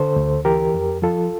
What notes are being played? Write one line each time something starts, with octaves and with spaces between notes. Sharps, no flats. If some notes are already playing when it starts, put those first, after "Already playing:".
Already playing: D3 A4 C5
D2
E3 G4 A#4
F2
F3 F4 A4